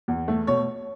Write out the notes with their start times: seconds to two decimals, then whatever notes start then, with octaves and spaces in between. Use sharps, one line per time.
0.08 E2
0.28 A3
0.47 B2 C#5